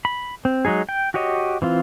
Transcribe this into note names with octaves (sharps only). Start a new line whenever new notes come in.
B5
C4
F#3 G#3 D#4 G#4
G5
F#4 G4 C#5 D#5
E3 C4 F4